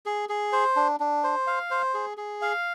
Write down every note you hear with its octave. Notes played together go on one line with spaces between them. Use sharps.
G#4
G#4
C5
D4
D4
C5
F5
C5
G#4
G#4
F5